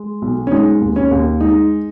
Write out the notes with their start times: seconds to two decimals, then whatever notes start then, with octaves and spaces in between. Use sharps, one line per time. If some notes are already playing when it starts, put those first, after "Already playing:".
Already playing: G#3
0.22 B1
0.47 C#4
0.52 G#3 D#4
0.81 D#2
0.96 C#4
1.11 D#2
1.40 G#3 D#4